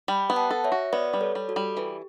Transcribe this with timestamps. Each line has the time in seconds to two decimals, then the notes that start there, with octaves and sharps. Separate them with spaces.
0.08 G3 G5 B5
0.30 B3
0.36 F#5 A5
0.51 A4
0.64 C#5 E5
0.72 F#4
0.93 B3 B4 D5
1.13 G3
1.21 A4 C#5
1.35 G3
1.49 F#4 A4
1.56 G3
1.77 E3 G4